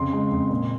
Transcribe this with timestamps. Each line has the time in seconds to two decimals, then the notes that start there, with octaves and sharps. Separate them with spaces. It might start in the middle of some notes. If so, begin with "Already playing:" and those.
Already playing: F2 C#3 C6
0.13 G#3
0.32 F2
0.51 A#2